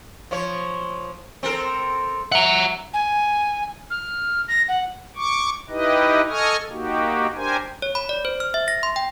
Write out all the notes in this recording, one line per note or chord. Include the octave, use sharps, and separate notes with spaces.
F3 C#5
C4 A4 A#4
E5 F#5 A#5
G#5
F6
A#6
F#5
C#6 D6
D#4 E4 G4 B4 D#5
A4 D#5 G#5 C#6 D#6 F6
A#3 D#4 F#4 G4
D4 G4 A#4 C5 G#5
C#5
B5
D5
C5
F6
E5
A#6
C6
G5